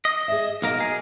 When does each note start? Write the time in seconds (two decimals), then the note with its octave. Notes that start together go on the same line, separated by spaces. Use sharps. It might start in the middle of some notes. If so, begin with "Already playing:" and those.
0.05 D#5
0.28 G#4 D5 E5
0.62 B1 A#3 F#4 A#4 D#5
0.80 G#4